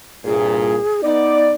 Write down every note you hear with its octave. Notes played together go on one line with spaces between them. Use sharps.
C2 G2 A#2 G#4
B3 D#4 D5